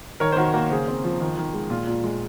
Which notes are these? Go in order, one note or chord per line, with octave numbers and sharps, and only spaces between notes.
D#3 A#4 C#5
C5
D#3 F#4 A#4
A#3 F#4 A#4
C#3 G#4 C5
C4
F3
D#3
D#3
G#3
A#2 F4
A#2
G#3